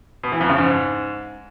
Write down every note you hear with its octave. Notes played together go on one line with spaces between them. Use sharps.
B2
E3
F2
C#3
G#2